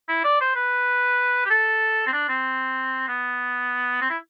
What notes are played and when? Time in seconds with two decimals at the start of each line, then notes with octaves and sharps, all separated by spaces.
0.09 E4
0.24 D5
0.41 C5
0.56 B4
1.45 G4
1.50 A4
2.07 C4
2.13 D4
2.29 C4
3.08 B3
4.02 C4
4.10 E4